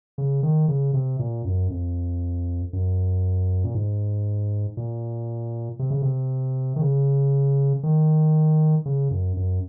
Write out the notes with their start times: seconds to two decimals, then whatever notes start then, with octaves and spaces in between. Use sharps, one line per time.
0.18 C#3
0.43 D#3
0.68 C#3
0.94 C3
1.19 A#2
1.45 F#2
1.70 F2
2.73 F#2
3.64 A#2
3.75 G#2
4.77 A#2
5.79 C3
5.91 C#3
6.02 C3
6.76 D#3
6.81 C#3
7.83 D#3
8.86 C#3
9.11 F#2
9.37 F#2